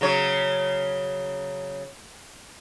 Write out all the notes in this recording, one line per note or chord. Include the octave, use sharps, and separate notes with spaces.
C#3 F#3 C#5